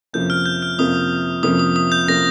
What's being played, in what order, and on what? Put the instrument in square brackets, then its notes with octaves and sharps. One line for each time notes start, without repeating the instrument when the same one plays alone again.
[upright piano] F2 C3 F3 A#3 C#4 [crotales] G6
[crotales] F6
G6
F6
[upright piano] F2 C3 F3 A#3 C#4 [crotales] D#6
[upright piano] F2 C3 F3 A#3 C#4 [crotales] D#6
[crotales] D#6
D#6
G6
[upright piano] C3 F3 A#3 C#4 [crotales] A#6